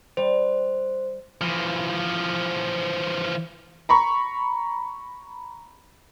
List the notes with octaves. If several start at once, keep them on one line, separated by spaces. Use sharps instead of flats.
G3 C5
E3 F3
A#5 B5 C#6